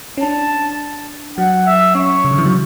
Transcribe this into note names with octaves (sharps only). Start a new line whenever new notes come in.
C#4
D4 A5
F#3 F#5
E5
C#4 C#5
C#3
D3
E3
F#3